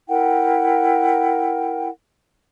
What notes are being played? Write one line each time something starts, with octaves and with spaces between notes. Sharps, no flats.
E4 A#4 F#5 G5